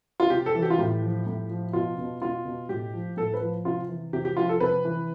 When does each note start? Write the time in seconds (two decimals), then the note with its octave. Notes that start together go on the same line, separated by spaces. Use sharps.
0.20 F4
0.30 C3 G4
0.46 A4
0.55 E3
0.62 G4
0.70 F4
0.79 A2 G4
1.02 F3
1.27 A2
1.50 F3
1.73 B2 F4
1.98 B2
2.22 B2 F4
2.45 B2
2.69 A2 G4
2.93 F3
3.17 A2 A4
3.34 B4
3.41 F3
3.65 C3 F4
3.89 E3
4.13 C3 G4
4.25 G4
4.37 F3 F4
4.49 A4
4.60 C3 B4
4.85 E3